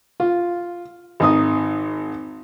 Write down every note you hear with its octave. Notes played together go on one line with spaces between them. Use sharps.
F4
G#1 D#4 D#6